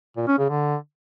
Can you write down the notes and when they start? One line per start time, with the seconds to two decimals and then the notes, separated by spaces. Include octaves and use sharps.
0.17 A#2
0.27 C#4
0.38 C#3
0.49 D3